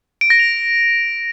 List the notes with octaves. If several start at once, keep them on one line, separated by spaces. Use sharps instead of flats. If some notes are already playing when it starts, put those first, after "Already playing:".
D7
A#6
F7